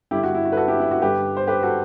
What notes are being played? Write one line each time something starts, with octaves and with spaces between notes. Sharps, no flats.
G2 D3 E4 G4
F#4
E4
F#4
B4
F#4 A4
E4 G4
E4
F#4
G2 D3 G4 B4
C5
G4 B4
F#4 A4